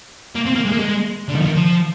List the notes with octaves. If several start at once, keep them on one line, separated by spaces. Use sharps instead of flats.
A#3
C4
A#3
G#3
A#3
G#3
D3
D#3
F3
D#3
F3